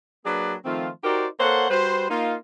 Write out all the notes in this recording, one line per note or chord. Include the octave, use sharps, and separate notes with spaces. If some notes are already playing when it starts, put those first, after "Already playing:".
F#3 A#3 D4 G#4 B4 D5
D#3 F3 A3 C4 F4
D#4 F#4 G4 A#4 C5 D5
A#3 A4 C5 C#5 F#5
G3 F#4 B4 C5
A#3 D#4 F4